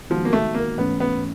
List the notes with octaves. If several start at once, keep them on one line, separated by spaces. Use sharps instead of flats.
D#3 F3 G#3 B3 D#4 F#4
A#3
A3
A#3
G#2 E3 A3 B3 C#4
B3